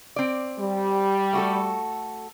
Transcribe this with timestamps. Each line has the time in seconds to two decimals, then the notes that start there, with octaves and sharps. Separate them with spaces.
0.16 C4 D5
0.58 G3
1.33 A3 F#4 A4